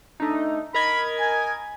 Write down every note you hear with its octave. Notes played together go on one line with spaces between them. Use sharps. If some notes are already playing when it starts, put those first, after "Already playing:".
A3 D4 D#4
A#4 D#5 B5 G#6
G#5